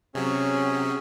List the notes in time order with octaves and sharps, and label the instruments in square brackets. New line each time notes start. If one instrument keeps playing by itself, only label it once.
[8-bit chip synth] C3 F#3 [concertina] C#4 G#4